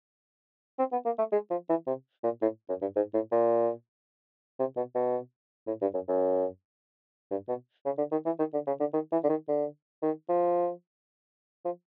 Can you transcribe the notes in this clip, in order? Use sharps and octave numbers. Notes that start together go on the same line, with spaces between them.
C4
B3
A#3
A3
G#3
F3
E3
C3
A#2
A2
F#2
G2
G#2
A2
A#2
C3
B2
B2
A2
G2
F#2
F#2
G2
B2
C#3
D3
D#3
E3
D#3
D3
C#3
D3
D#3
E3
D3
D#3
D3
D#3
F3
F3